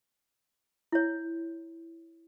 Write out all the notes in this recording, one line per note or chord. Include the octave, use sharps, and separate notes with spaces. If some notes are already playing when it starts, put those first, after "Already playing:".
E4 C#5